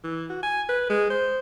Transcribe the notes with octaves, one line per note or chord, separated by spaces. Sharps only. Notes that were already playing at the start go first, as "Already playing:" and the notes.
E3
F#4
G#5
B4
G#3
C5